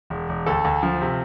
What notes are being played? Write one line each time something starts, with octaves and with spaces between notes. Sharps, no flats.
E1
E1
D2 A4
D2
F3
C3